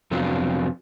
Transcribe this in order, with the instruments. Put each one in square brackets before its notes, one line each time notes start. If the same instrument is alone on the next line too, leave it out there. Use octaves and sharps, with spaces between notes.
[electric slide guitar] F2 C3 F#3 B3 D4 F4